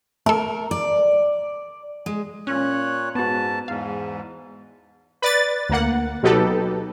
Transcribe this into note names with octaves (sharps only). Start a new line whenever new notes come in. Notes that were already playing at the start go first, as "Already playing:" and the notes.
A3 A4 A#4
D5
G#3
A#2 C#4 C#5 F#6
G#2 B3 F#4 A5
E2 G#2 F5
B4 D5 A6
D2 A#3 F#5
B2 F#3 D#4 G4 A4 B4